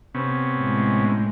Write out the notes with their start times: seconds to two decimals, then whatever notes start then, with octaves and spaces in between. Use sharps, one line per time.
0.14 C3 B3 C#4
0.58 A2 G#3